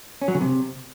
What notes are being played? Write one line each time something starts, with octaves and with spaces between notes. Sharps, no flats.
C#4
F#3
C#3
C3